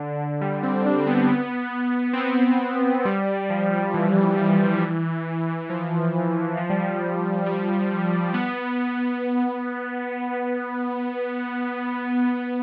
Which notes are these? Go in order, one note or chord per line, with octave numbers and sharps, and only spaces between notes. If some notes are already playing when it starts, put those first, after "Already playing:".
Already playing: D3
G3
C4
D4
B3
C4
B3
G3
F3
E3
F3
F3
G3
F3
G3
B3